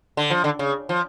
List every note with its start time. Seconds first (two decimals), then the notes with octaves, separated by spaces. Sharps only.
0.17 D3
0.30 F3
0.44 D3
0.59 C#3
0.89 F3